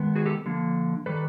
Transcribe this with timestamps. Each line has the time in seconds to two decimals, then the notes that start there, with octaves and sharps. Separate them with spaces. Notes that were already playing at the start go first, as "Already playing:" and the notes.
Already playing: D#3 G#3 B3
0.16 F#4 G#4
0.26 G4 A4
0.46 D3 F3 A#3
1.06 D#3 G3 A4 B4